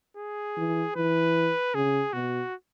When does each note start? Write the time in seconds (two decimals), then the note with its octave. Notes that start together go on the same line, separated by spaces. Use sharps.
0.17 G#4
0.57 E3
0.96 E3 B4
1.75 C#3 G#4
2.13 B2 F#4